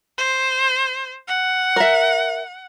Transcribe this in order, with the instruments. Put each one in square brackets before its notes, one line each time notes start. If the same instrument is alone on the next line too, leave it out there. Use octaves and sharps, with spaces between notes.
[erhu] C5
F#5
[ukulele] A#4 E5